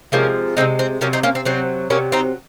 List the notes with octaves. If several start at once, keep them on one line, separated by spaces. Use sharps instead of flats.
C3 F3 G#3 A#3 C#4
C3 F3 G#3 C4 D#4
C4
C3 F#3 A#3 C#4
C4 D#4
A#3 C#4
C4
C3 F#3 C4
C3 F#3 A#3 C#4
C4 D#4